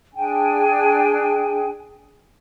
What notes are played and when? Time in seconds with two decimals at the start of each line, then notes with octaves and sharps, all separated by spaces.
0.14 D4 G#4 G5 G#5